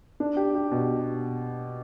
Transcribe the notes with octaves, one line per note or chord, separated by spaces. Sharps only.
D4
G4
G4
B2